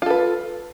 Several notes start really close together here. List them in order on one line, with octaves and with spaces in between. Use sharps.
F4 A4 B4